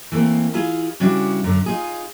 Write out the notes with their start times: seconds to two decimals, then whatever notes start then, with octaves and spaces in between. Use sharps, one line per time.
0.12 E3 A3 A#3 C4
0.54 E4 F4 G#4 F5
1.00 C#3 G3 C#4 D4 E4 F#4
1.44 F#2 D3
1.66 D#4 F4 G#4